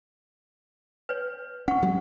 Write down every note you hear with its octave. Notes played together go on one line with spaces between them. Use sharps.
B4 C#5
C#4 F#5 C#6
F#3 G#3 B3